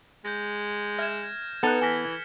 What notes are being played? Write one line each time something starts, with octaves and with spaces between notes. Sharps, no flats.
G#3 G6 A#6
E5 F6 G#6 E7
B3 D#4 A4 B4 A5 F#6 C#7
E3 G#5 F6 A#6 B6 G7